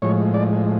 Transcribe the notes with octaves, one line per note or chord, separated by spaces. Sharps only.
A2 F3 G#3 C#5
D5